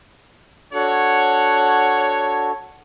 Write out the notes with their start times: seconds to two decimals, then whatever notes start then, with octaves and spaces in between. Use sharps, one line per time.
0.73 D4 F#4 A4 C#5 F#5